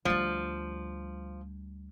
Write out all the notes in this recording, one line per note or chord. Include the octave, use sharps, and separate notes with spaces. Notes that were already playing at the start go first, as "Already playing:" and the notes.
D2 F3 G3